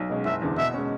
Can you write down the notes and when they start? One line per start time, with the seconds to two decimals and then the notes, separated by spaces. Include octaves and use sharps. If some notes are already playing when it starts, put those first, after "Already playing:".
Already playing: B1
0.09 B2 G#3 C#4
0.25 F#1 E5
0.42 E2 D3
0.58 B2 E5
0.74 G#3 C#4